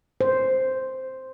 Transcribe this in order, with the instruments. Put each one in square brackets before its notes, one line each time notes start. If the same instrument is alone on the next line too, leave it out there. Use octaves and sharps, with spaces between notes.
[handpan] C5